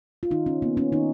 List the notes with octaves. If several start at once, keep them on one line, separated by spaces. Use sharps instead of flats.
F4
D#3 D#4
C#4
A#3 B3
C#4
D#3 D#4